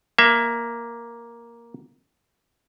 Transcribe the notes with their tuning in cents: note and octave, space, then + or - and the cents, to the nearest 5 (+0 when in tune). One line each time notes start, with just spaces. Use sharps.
A#3 +5 E5 +20